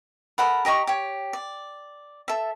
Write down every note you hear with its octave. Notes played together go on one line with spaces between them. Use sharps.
A4 A#4 F#5 B5
G4 D#5 A#5 C#6
G4 C#5
D5
A4 E5